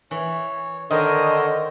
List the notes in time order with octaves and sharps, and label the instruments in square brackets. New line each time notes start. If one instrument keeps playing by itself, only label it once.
[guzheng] E3 [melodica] C#5
[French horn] D3 [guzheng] D#3 [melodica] A#4 C5 C#5 [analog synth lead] D#5